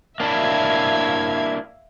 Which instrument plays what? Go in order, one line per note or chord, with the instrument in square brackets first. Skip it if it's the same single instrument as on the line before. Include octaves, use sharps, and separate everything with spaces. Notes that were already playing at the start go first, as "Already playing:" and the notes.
[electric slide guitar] A#3 D4 E4 [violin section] E5 F5 G#6